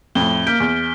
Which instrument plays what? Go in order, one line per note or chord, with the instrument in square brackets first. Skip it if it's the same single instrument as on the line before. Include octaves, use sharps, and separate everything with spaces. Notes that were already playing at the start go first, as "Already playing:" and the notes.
[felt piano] F2 A2 [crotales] G7
[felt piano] A#3 G6 [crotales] F6 B6 D7
[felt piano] E2